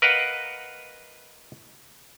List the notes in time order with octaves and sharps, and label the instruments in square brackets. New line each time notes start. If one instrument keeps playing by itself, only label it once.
[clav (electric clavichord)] A#4 B4 D#5 F5 F#5